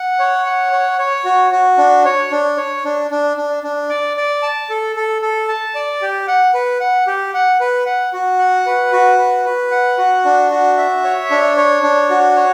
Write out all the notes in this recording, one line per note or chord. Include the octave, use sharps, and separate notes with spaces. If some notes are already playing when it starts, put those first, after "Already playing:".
Already playing: F#5
C#5
F#5
C#5
C#5
F#4
F#4
D4
C#5
D4
C#5
D4
D4
D4
D4
D5
D5
A5
A4
A4
A4
A5
D5
G4
F#5
B4
F#5
G4
F#5
B4
F#5
F#4
F#5
B4
F#4
B4
B4
F#5
F#4
D4
F#4
E5
C#5
D4
C#5
D4
F#4
C#5